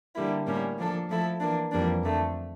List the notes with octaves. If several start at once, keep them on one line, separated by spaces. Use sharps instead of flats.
D3 G3 A#3 E4
A2 G3 A#3 C#4
F3 A#3 D4 A4
F3 A3 E4 A4
E3 A#3 D4
F2 E3 G3 A#3 D4
F2 D3 A3